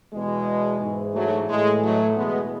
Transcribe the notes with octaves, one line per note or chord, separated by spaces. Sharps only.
E2 B2 G#3
G#2 E3
F#3 A3
A2 E3 G#3
F#3 A3
E2 B2 G#3 B3